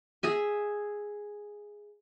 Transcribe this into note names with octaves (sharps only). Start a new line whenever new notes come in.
G#4 E5 G#5